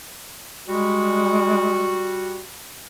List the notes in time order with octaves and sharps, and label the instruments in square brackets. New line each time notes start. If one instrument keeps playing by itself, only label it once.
[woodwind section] G3 F#4 [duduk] G#3